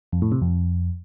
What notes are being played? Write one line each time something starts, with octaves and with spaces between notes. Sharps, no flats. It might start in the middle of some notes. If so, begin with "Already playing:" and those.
F2
A2
C3
F2